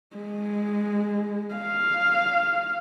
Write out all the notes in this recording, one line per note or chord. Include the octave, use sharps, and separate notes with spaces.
G#3
F5